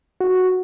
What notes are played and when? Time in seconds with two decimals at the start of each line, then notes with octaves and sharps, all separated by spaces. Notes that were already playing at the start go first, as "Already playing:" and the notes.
0.21 F#4